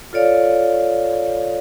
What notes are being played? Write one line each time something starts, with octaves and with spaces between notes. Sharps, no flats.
F4 A4 C#5 D5 F5